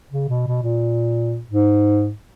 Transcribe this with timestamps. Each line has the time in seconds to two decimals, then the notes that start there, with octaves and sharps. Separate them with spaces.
0.12 C#3
0.28 B2
0.47 B2
0.63 A#2
1.49 G#2